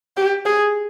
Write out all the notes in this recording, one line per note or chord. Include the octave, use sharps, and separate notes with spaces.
G4
G#4